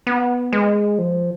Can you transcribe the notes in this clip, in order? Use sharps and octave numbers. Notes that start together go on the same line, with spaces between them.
B3
G#3
F3